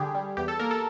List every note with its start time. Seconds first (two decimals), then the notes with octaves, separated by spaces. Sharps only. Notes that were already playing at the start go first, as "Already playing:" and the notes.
Already playing: D3 G3 G4 G#4
0.15 G3
0.37 E2 G4
0.48 A4
0.60 A#3 A#4
0.71 A4